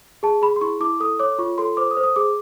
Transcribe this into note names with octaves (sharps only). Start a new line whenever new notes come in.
G#4 A5
G#4 B5
C6
E4 C#6
E4 D6
A4 D#6
C#5 D6
F4 C#6
A4 C6
C5 D6
D#6
C5
D#6
G#4 D6